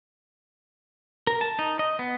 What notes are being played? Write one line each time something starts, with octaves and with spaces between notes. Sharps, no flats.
A#4
A5
D#4
D#5
B3